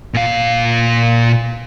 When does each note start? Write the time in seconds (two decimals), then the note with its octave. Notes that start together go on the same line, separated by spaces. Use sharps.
0.14 A#2 F5